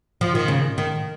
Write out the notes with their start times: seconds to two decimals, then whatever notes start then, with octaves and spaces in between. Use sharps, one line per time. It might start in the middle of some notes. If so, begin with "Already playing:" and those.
0.21 F3
0.35 D#3
0.48 C#3
0.78 D#3